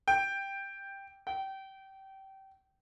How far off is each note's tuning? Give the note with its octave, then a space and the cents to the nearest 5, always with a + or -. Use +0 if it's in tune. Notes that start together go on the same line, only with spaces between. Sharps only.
G5 +5
G5 -25